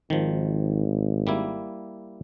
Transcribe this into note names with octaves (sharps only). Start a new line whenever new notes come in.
G#1 D#3 F3
G3 A#3 E4